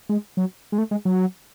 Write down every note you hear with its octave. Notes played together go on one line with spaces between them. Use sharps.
G#3
F#3
G#3
A3
G#3
F#3